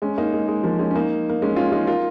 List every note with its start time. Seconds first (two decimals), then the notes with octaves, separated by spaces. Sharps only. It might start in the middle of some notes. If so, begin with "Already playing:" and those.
0.02 G#3 C#4
0.18 A#3 D#4
0.33 G#3
0.48 G#3
0.63 F3 A#3
0.79 G#3 C#4
0.91 C#4
0.95 A#3 D#4
1.30 A#3
1.42 G#3 C#4
1.56 C#4 F4
1.72 D#4 G#4
1.87 F4 A#4